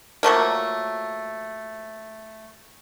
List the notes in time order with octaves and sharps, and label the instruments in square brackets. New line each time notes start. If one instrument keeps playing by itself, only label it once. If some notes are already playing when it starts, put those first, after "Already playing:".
[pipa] F3 F#3 A3 A#3